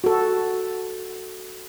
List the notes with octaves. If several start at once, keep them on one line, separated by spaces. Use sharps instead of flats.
F#4 A4